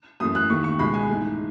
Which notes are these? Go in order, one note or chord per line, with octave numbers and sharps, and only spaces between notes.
F#2 E3 A3 D#6
F#6
D#2 D#3 A3 C#6
C#6
C#2 B2 G#3 B5
G#5
G#2 E3 A3